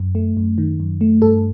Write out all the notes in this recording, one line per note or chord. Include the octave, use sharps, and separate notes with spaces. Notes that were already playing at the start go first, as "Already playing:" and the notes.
Already playing: F#2
A3
F#2
D#3
F#2
A3
G2 A4